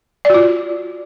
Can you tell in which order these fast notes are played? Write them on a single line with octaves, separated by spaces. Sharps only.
D5 F#4 F4